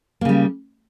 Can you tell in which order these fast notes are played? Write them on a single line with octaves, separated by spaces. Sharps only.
A#3 C#3 G3